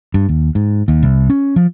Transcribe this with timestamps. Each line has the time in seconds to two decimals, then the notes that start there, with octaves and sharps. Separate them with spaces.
0.14 G2
0.29 D#2
0.55 G#2
0.88 D#2
1.03 C2
1.30 C#4
1.56 F3